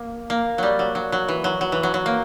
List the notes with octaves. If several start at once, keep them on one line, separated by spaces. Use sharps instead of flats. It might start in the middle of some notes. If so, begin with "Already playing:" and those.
Already playing: A#3
A#3
F#3 G3
F#3
F#3
F#3
E3
F#3
F#3
E3
F#3
F#3
A#3